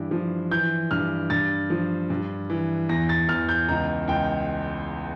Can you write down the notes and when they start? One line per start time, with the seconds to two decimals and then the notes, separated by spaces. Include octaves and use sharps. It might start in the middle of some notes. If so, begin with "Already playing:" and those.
Already playing: G2 E3
0.11 F3
0.51 E3 G6
0.91 G2 F6
1.30 G2 A6
1.70 F3
2.10 G2
2.50 E3
2.89 E2 A#6
3.09 A6
3.29 E2 F6
3.49 G6
3.69 C#2 A#5
4.08 C#2 G5